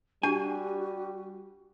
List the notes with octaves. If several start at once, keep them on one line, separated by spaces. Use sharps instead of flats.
G3 D4 F#4 G4 G#5